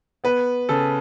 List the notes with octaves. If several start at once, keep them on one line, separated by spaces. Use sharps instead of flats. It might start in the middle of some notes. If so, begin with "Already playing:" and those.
B3 B4
C#3 A4